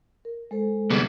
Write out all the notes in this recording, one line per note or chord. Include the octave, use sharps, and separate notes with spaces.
A#4
G#3 A4 C5
C3 G3 B3 G#4